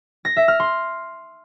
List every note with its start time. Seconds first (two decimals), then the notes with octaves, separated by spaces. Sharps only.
0.25 A#6
0.36 E5
0.48 F6
0.60 C6